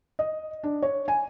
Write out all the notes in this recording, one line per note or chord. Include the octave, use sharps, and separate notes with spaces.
D#5
D4
C#5
G#5